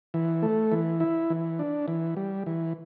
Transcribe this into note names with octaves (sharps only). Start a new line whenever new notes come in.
E3
A3
E3
E4
E3
D4
E3
G3
E3